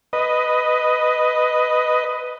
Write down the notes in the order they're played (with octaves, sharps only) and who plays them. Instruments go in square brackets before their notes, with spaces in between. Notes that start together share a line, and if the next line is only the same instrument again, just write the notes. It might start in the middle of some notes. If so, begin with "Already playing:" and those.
[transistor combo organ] B4 D#5